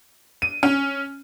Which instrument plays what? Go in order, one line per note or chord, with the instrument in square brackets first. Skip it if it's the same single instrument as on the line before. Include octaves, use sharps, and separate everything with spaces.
[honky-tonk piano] D#7
C#4